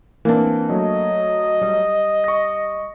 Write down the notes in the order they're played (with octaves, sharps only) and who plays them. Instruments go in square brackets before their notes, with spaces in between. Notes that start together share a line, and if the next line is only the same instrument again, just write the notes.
[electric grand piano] E3 C4 [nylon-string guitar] A#3 D4
[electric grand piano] F#3 A3 [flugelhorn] D#5
[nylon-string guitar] G3
[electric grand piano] C#6 A#6